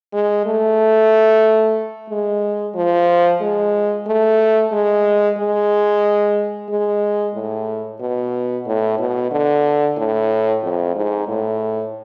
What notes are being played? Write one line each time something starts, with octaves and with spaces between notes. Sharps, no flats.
G#3
A3
G#3
F3
G#3
A3
G#3
G#3
G#3
A2
B2
A2
B2
D3
A2
F2
G#2
A2